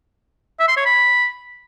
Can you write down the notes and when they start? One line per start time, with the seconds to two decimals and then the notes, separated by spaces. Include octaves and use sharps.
0.60 E5
0.68 C6
0.77 C#5
0.85 B5